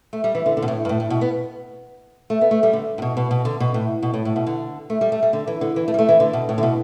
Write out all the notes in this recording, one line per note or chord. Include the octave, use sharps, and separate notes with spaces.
A3
G3
E3
D3
D3
B2
A2
G2
A2
A2
B2
B3
A3
B3
A3
G3
D3
A2
B2
B2
B2
D3
B2
A2
B2
A2
A2
B2
D3
A3
G3
A3
G3
D3
E3
D3
E3
A3
G3
A3
E3
D3
B2
A2
D3
B2